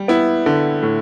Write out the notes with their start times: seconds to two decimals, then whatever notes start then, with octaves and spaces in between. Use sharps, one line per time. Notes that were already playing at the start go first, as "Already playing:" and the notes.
Already playing: G3
0.08 B3 E4
0.46 D3
0.82 A2